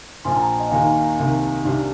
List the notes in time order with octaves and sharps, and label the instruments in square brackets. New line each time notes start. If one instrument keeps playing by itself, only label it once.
[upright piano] A#1 A#2 F3 [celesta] G#5 C6
[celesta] G5 A#5
D#5 G5
[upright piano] D#2 D#3 A#3 D#4 [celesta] F5 G#5
[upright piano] C2 C3 D#3
C2 C3 G3 D4